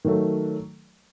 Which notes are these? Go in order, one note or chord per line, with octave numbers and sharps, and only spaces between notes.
D#3 F#3 A3